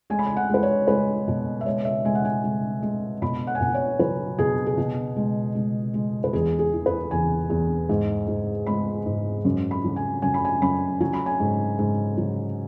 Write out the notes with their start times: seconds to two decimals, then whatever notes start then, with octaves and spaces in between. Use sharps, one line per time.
0.10 G#3 G#5
0.19 B5
0.26 G#5
0.37 F#5
0.49 G#3 B4
0.63 C#5
0.87 G#3 B4
1.28 B2
1.61 E5
1.66 G#3 C#5
1.85 E5
2.05 G#3 G#5
2.15 F#5
2.25 G#5
2.44 G#3
2.83 G#3
3.22 B2 B5
3.47 F#5
3.55 G#5
3.61 B2 F#5
3.74 C#5
3.99 F#3 B4
4.39 B2 G#4
4.66 G#4
4.78 B2
5.16 G#3
5.55 G#3
5.94 G#3
6.24 B4
6.33 E2 G#4
6.59 G#4
6.73 E3
6.86 B4
7.11 E2 G#5
7.50 E2
7.89 G#2
8.28 G#2
8.67 G#3 B5
9.06 G#2
9.45 F#2
9.71 B5
9.84 F#3
9.96 G#5
10.22 F#2 G#5
10.34 B5
10.45 G#5
10.62 F#2 B5
11.00 F#3 G#5
11.13 B5
11.26 G#5
11.40 G#2
11.79 G#2
12.17 F#3